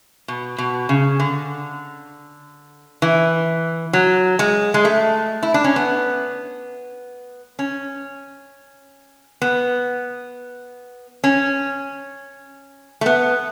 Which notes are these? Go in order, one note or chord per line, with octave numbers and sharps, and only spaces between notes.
B2
B2
C#3
D3
E3
F#3
G#3
G#3
A3
E4
D4
C#4
B3
C#4
B3
C#4
A3
B3